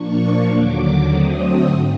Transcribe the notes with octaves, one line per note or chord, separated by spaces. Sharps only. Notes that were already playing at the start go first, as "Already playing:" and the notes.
Already playing: A#2 F3 A#3 D4 C#6
D#2 D3 F#3 D6
D3 F#3 A3 C4 D#6
G#2